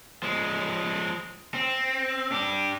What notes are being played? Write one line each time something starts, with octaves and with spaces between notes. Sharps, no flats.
F3 G#3
C4
D4 G4